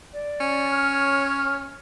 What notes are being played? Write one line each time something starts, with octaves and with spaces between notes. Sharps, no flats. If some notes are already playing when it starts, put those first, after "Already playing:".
D5
C#4
C#5 F6